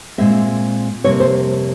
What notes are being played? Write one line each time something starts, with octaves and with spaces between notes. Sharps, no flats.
A#2 G#3 C4 E5
F2 C3 G3 A#3 C#5
C5